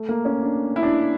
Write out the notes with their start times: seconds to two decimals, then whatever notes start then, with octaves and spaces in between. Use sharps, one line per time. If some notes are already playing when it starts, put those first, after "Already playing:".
Already playing: A3
0.09 A#3
0.25 C#4
0.43 D4
0.76 E4
0.83 D4